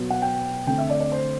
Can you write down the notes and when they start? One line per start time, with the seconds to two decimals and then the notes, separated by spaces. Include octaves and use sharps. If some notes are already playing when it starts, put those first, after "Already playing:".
Already playing: B2 F#3 B3
0.10 F#5
0.22 G5
0.67 D3 A3 C4 G5
0.78 E5
0.90 D5
1.00 D5
1.12 C5